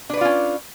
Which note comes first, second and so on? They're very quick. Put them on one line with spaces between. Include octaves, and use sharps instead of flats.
D4 B4 D5 F4 C#4